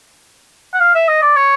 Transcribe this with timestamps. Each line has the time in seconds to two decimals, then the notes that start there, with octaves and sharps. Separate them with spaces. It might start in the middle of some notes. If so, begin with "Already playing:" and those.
0.74 F#5
0.80 F5
0.95 E5
1.08 D#5
1.22 D5
1.36 C#5